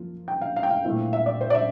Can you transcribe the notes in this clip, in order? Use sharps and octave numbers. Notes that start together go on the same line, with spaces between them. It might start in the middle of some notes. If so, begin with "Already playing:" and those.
Already playing: F3 A#3 F4
G5
F5
F5
G5
F5
A#2 A3 C4 E4
E5
D5
C5
D5
E5